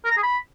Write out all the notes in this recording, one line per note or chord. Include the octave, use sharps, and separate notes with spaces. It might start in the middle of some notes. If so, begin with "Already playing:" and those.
A#4
A#5
G#4
B5